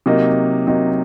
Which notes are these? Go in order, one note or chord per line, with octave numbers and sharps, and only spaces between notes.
C3 F#3 A#3 D#4
C3 F#3 A#3 D#4